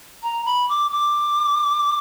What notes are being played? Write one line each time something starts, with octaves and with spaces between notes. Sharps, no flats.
A#5
B5
D6
D6